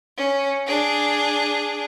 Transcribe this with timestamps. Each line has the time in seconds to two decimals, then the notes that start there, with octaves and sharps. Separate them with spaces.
0.17 C#4
0.67 D4 G#4